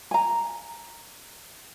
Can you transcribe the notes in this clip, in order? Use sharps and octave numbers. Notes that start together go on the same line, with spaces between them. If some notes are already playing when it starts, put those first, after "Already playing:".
G#5 A#5